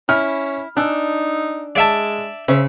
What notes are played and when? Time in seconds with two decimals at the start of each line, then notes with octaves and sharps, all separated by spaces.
0.09 C#4 E4 F6
0.77 D4 D#4 G#5 E6 F#6
1.76 G#3 D5 E5 A5
2.48 C#3 C5 C#5 E5